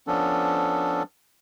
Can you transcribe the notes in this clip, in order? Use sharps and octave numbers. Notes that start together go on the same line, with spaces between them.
F3 B3 C#4 D4 A4